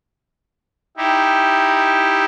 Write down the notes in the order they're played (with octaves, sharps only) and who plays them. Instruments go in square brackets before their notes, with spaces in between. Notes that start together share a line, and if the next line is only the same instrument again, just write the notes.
[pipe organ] D#4 E4 G4